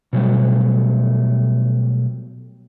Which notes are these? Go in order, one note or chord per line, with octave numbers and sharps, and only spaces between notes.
B2 F#3 G3 A3